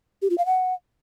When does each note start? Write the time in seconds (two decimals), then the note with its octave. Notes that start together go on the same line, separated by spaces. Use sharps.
0.22 G4
0.30 F4
0.38 F5
0.46 F#5